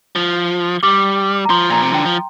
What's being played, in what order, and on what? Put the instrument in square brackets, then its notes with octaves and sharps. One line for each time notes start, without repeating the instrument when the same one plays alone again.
[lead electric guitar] F3
[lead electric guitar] G3 [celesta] D6
[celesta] A#5
[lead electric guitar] F3 [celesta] C6
[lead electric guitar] A#2 [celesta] A#5
[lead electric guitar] C3
[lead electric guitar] D3 [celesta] G5
[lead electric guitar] F3